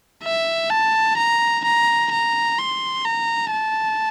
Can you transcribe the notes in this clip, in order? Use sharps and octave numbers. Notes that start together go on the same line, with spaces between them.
E5
A5
A#5
A#5
A#5
C6
A#5
A5